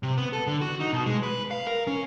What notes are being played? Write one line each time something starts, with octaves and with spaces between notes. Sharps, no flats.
C3
B3
A4
D3
F#4
D#4
B2
G#3
B4
F5
A#4
C#4